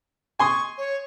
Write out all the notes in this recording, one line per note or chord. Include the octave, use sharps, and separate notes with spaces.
G#5 C6 C#6 D#6
C#5